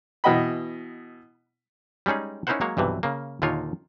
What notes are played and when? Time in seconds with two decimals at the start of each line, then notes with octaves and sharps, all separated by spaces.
0.24 B2 E3 D#5 G5 B5
2.06 G3 G#3 C#4 D#4 G#4
2.47 C#4 D#4 E4 A#4 C5 F#5
2.61 F#3 G#3 A#3 C#5
2.77 B1 G2 C3 E3
3.03 C#3 A#3
3.42 D#2 A#2 D3 D#4 F4 C#5